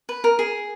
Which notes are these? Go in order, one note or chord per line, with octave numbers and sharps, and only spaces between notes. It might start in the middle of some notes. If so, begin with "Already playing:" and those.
B4
A#4
G#4